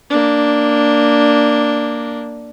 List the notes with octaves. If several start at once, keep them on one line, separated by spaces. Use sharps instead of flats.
A#3 D4